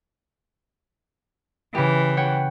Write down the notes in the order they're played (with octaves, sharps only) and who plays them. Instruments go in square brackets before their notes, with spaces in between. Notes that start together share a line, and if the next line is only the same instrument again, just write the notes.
[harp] C#3 G4 [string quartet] E3
[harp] C#5 F#5 G5